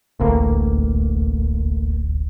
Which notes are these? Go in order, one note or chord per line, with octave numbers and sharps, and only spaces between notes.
D#1 A1 D2 A3 A#3